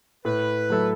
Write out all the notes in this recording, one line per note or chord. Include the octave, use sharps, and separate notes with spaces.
A2 B4
F#3 A3 E4 A4